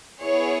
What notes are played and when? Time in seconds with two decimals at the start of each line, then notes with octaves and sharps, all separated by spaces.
0.21 B3 E4 G#4 C#5